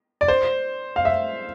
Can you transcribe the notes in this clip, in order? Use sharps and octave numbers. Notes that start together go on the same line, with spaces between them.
D5
C5
F5
E5